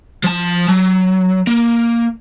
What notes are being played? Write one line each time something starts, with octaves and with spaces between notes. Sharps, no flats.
F3 A5
F#3
A#3